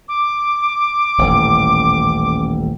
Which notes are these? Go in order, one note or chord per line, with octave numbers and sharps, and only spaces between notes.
D6
D#1 A1 E3